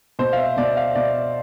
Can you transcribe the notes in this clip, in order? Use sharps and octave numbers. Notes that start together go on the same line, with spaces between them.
B2 C5
F5
E5
B2 D5
F5
B2 D5